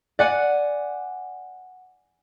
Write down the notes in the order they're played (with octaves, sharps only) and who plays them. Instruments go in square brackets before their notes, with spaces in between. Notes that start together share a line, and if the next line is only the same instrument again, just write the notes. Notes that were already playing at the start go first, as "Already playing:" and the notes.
[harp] D5 F#5 G#5